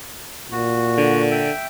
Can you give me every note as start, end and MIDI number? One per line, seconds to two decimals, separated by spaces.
0.51 1.53 46
0.51 1.22 66
0.98 1.51 50
1.31 1.67 76
1.31 1.67 79